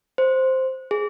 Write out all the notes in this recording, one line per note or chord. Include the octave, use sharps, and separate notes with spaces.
C5
G#4